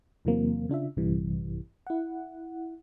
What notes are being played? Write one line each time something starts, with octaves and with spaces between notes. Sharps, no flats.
E2 C3 E3 F#3 A#3 C4
C#3 D4 F4 E5
A#1 G2 C3 E3 G3
E4 F#5